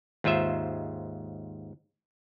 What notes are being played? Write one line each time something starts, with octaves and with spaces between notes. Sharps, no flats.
D#2 G#2 F4 C5 E5